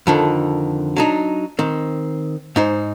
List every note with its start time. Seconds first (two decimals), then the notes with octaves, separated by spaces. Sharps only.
0.07 F2 D3 D#3
0.96 F#3 D4 D#4
1.59 D#3 C4
2.56 G#2 D#4 C5